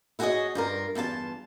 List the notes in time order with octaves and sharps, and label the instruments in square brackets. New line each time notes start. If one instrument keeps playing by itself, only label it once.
[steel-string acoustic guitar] E4 F#4 G#4 C5 C#5 D#5
G2 F4 A#4
E2 G2 F4 A5